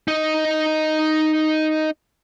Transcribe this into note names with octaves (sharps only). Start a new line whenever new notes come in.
D#4 D#5